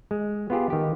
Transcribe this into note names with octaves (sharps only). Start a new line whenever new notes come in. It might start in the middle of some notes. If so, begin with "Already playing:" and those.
G#3
B3 F4 G4 G#4
D#3 G4